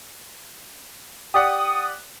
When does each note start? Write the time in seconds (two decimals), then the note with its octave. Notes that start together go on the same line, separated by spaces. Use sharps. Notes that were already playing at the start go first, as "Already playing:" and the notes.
1.34 G4 D5 F#5 D#6